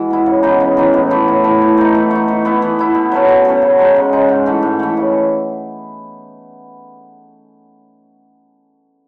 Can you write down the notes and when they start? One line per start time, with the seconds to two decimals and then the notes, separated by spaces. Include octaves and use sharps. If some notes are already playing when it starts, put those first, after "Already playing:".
Already playing: E3 G#3 F#4
0.10 B3 E4
0.26 C#3
0.43 E3 B3 D#4
0.60 C#3
0.77 E3 B3 D#4
0.94 A2
1.10 E3 A3
1.28 A2
1.44 E3 A3
1.61 E3
1.77 A3 D#4
1.95 E3
2.11 A3 D#4
2.28 E3
2.45 B3 E4
2.62 E3
2.79 B3 E4
2.95 B2
3.12 F#3 A3 C#4
3.29 B2
3.45 F#3 A3 C#4
3.62 C#3
3.79 G#3 D#4
3.96 C#3
4.13 G#3 D#4
4.29 G#2
4.46 E3 A3
4.62 G#2
4.79 E3 A3
4.97 C#3